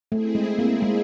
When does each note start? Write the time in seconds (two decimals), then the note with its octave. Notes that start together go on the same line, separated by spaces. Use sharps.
0.11 A3 C4 E4 G#4
0.35 G#3
0.59 A#3
0.82 G#3